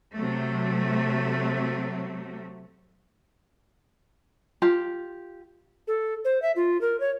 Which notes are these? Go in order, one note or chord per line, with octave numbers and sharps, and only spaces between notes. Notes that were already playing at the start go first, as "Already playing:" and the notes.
C3 F#3 A3
F4 G4
A4
C5
E5
F4
A#4
C#5